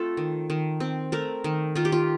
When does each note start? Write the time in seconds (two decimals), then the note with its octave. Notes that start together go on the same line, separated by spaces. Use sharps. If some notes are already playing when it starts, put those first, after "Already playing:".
Already playing: A3 C4 F4 A4 C5
0.17 D#3
0.50 D#3
0.80 C4
1.12 A3 A#4
1.44 D#3
1.75 D#3 F4
1.85 G4
1.92 F4